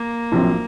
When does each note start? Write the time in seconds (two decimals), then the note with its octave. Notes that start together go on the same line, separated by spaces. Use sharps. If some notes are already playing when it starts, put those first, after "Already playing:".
Already playing: A#3
0.32 A#1 A2 F#3 C4